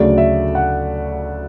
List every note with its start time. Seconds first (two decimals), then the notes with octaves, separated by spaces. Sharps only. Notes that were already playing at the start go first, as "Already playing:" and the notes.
Already playing: D2 C#3 F#3 A3 D5
0.18 E5
0.55 F#5